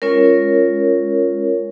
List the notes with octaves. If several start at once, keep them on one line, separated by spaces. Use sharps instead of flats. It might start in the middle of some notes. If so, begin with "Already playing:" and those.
G#3 C#4 F4 A#4 C#5